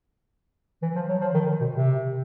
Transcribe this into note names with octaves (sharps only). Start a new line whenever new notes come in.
E3
F3
F#3
F3
D#3
B2
C3